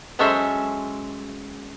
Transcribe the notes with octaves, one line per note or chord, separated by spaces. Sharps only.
F#3 G#3 C#4 A4 C5 E5